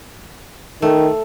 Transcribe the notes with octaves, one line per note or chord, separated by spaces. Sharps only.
D#3 A3